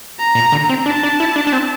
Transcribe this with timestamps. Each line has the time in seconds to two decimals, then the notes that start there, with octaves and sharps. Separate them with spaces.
0.19 A#5
0.35 A#2
0.52 D3
0.69 C4
0.86 D4 A5
1.03 D4
1.20 E4
1.36 D4
1.47 D4
1.53 C4